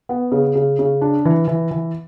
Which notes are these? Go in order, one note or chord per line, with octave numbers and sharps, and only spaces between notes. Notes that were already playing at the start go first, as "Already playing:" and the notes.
B3
C#3
C#3
C#3
D4
E3
E3
E3